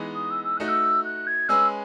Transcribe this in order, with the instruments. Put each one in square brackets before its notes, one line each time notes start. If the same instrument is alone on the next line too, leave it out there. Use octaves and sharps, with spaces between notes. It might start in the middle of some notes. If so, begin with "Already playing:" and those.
Already playing: [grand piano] E3 G#3 B3 D#4 G#4
[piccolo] D#6
E6
E6
[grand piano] A3 D#4 F#4 [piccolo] F#6
[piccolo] E6
F#6
G#6
[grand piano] G#3 C#4 G#4 B4 [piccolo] E6